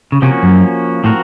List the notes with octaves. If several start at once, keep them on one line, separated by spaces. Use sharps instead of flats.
C#3
C3 F3 A#3 C#4 F#4
F#2
A2 F3 C4 F#4 A#4